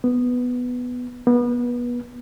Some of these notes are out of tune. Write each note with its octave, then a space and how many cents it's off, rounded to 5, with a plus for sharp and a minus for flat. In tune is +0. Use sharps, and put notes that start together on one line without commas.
B3 +5
B3 -25